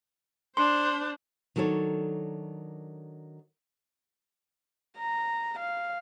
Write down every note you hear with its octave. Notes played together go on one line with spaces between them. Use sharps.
D4 C5 C6
D#3 F#3 D4 A4 C#5
A#5
F5